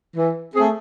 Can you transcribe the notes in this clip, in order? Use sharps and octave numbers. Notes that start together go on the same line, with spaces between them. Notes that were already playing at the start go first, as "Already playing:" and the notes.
E3
A3 C4 G#4